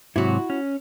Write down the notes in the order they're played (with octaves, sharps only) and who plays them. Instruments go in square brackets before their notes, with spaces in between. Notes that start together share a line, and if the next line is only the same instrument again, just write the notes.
[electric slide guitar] G#2 C3 F#3 [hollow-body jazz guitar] E4 F#4
[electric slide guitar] C#4